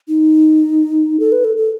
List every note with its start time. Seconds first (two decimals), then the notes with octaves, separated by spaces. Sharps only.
0.08 D#4
1.20 A4
1.32 B4
1.44 A4
1.57 A4